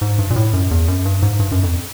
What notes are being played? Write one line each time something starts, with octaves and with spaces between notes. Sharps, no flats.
G#2
G2
A#2
A2
F#2
E2
F#2
G2
G#2
G2
F#2
F2